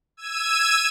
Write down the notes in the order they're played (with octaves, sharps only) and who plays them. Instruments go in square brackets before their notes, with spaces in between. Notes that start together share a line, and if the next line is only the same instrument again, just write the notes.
[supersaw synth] E6 G#6 D#7